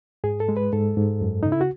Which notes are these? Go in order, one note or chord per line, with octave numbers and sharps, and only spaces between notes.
G#2 G#4
A4
G#3
B4
G#2 A4
G#2
F#2
C#3 D#4
E4
F#4